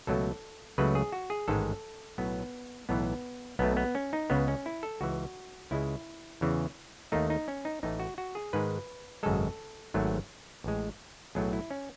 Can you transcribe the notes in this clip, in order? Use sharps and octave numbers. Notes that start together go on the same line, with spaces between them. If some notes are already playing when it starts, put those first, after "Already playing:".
C#2 B2 F#3 A3 A4
C#2 C#3 F#3 A3 B4
G#4
F#4
G#4
A1 G#2 D#3 G#3 A4
B1 A2 F#3 B3
B1 A2 E3 B3
B1 B2 A3 B3
B3
C#4
D#4
C#2 C#3 G#3 B3
C#4
E4
A4
C#2 C#3 E3 F#4
C#2 C#3 G#3 E4
E2 C#3 E3
D#2 D#3 A3 D#4
D#4
C#4
D#4
A1 A2 E3 A3 D#4
F#4
F#4
G#4
G#2 D#3 G#3 B4
G#1 F#2 C#3 G#3 A4
G#1 G#2 F#3 A3
A1 A2 G#3
B1 A2 F#3 A3 G#4
E4
C#4